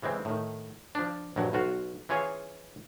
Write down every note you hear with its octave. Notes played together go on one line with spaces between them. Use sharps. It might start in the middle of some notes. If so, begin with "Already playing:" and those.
C#3 E3 G#3 C4
A2 D#3
F3 D4
A#1 G2 F#3
B1 F4 F#4 F5
E3 C#4 F4 G#4 C#5 G#5